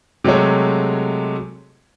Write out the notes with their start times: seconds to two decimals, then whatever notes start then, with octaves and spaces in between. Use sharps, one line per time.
0.24 C3 F#3 G#3 A3 C#5